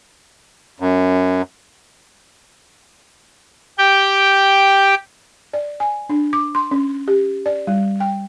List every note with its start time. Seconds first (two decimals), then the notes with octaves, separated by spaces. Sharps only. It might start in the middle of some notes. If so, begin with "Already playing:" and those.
0.80 F#2
3.78 G4 G5
5.53 D5
5.80 G#5
6.09 D4
6.33 D6
6.55 C6
6.71 C#4
7.08 G4
7.46 D5
7.67 G3
8.00 G5